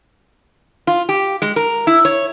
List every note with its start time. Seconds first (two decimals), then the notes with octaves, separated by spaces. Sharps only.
0.87 F4
1.09 G4
1.42 G#3
1.56 A#4
1.87 E4
2.05 C#5